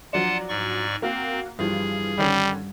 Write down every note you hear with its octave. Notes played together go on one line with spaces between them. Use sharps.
F3 F#3 D4 F4 F#5 A5
G#2 D5 C#6
A#3 C4 F#4 F5
G2 E3 F3 F4 G#4
D3 D#3 G3 C#4